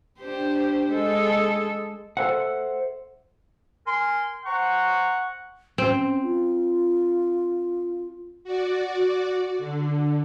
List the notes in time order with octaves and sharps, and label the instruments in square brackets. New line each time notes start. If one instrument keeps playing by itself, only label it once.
[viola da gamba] D4 G4 C5
G#3 A4
[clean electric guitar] A4 A#4 C5 E5 F#5
[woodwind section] A#4 G#5 C6
[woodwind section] C5 A#5 C#6 [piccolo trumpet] F#5
[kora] C4 [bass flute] C#4
[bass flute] F4
[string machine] F#4 D5
D3